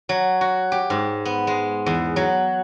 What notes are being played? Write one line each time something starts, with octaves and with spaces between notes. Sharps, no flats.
F#3
F#4
G4
G#2
B3
G#3
E2
F#3